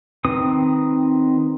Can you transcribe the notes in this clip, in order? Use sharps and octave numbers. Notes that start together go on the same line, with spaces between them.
D#3 C4 B4 D#6